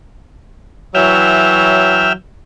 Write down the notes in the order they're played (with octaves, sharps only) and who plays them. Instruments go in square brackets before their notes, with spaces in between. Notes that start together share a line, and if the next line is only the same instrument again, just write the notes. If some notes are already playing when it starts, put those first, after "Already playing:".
[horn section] E3 F#3 [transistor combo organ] E5 G5 F6